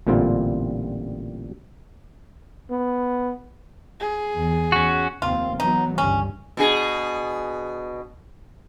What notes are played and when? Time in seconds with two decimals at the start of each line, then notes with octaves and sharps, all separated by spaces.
0.07 A1 A#2 D3 G3 C4 F4
2.71 B3
4.00 G#4
4.36 E2
4.72 C#4 F#4
5.22 F1 D#2 C4 F4
5.60 E3 F#3 B3 D#4
5.98 G1 C#2 G2 C#4
6.57 B2 D4 G#4